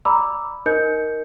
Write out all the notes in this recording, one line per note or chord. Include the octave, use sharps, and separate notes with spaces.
D5 A#5 B5 D6 E6
D#4 A#4 C5 D#5 G6 C#7